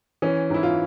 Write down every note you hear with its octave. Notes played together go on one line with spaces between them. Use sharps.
E3 C#4
G#2 E4
F4